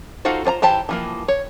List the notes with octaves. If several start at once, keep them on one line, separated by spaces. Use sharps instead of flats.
D#4 F4 F#4 A4 C5
F4 C5 A5 A#5
E3 G4 C5 A5
E3 F3 A#3
C#5